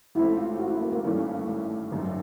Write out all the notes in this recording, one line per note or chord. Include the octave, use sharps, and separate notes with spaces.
A1 G#2 E3 A3 C4 E4
F4
F#4
E4
A#3
A#3
G#1 G2 E3 A3 C#4
A3
G#1 F#2 D#3